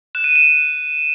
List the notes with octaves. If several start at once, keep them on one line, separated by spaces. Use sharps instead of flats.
F#6 E7
D#7
E7